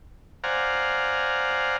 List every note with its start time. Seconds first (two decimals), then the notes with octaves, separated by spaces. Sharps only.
0.44 C5 D5 F5 F#5 G#5 A#5